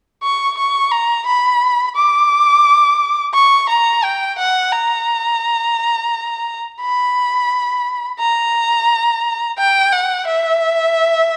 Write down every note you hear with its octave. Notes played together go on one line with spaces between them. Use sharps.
C#6
C#6
A#5
B5
D6
C#6
A#5
G5
F#5
A#5
B5
A#5
G5
F#5
E5